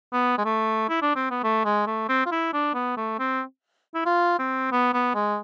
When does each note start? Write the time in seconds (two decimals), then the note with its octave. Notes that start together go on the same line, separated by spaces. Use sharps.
0.13 B3
0.38 G#3
0.45 A3
0.89 E4
1.02 D4
1.16 C4
1.31 B3
1.44 A3
1.65 G#3
1.87 A3
2.09 C4
2.26 F4
2.32 E4
2.54 D4
2.74 B3
2.97 A3
3.19 C4
3.95 E4
4.06 F4
4.39 C4
4.72 B3
4.94 B3
5.15 G#3